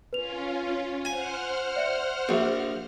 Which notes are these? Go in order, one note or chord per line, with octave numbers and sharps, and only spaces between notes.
C#4 F4 B4 F7
C5 F#5 G#5 F6
D5 E5 C#7
A#1 F#4 E5